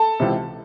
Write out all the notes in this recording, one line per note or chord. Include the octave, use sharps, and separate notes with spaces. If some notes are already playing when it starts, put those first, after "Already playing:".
Already playing: A4 A5
C#2 C3 E3